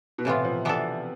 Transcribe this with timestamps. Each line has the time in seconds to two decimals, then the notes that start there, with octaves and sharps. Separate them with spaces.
0.18 B2
0.25 A2 C3 E3 B3 F4
0.45 F3
0.65 E3 B3 D4 A4